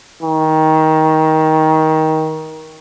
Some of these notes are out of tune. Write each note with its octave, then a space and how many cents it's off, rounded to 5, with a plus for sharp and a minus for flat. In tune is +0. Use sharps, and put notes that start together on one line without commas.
D#3 +20